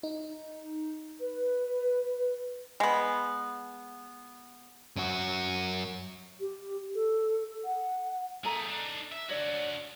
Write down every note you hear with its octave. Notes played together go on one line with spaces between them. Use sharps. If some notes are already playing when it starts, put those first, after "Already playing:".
D#4
B4
G#3 B3
F#2 F#4
G4
A4
F#5
A3 G#4 A4 A#5
D4 D#4
E5
D4 F#4 C#5 D5